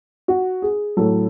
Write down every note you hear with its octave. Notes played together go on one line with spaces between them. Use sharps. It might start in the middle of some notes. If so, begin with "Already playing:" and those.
F#4
G#4
A2 F#3 A4